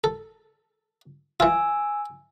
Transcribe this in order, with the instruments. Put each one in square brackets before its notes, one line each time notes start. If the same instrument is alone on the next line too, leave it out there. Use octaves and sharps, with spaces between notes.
[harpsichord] A4
[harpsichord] E3 F4 [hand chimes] G#5 E6